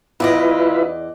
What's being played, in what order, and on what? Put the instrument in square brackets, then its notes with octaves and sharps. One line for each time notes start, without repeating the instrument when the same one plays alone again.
[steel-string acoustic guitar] E2 D5 D#5 [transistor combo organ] E4 F4 B4